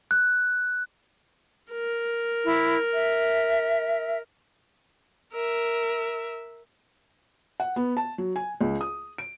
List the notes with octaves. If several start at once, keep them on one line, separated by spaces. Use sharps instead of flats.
F#6
A#4
E4
E5
A#4 E5
F#5
B3
A5
F#3
G#5
C#2
D#6
D7